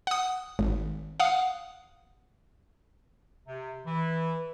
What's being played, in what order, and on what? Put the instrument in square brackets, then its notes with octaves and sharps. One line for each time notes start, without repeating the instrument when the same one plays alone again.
[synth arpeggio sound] F#5 D#6
G#1
F5 F#5 D#6
[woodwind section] C3
E3